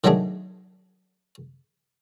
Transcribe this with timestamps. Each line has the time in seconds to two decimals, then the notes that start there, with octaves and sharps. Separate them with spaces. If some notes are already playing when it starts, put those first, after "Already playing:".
0.04 D#3 F#3 G#3 A3 D4 G#4